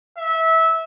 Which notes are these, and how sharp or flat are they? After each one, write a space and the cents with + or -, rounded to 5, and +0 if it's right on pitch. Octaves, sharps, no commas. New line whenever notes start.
E5 -20